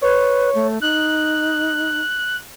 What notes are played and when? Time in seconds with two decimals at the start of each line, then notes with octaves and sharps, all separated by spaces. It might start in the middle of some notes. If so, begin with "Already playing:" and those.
0.02 B4 C#5
0.55 A3
0.81 D#4 F#6